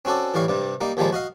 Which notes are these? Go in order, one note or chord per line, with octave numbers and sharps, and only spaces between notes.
C4 C#4 F#4 A4 D5
A2 E3 G3 F5 C#6
G2 C3 G3
G3 A#3 D#4
D#2 D#3 F3 G3 G#3 A#5
F#4 D#5 F5